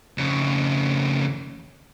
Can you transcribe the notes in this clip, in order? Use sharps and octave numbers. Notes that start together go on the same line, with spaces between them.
F2 C#3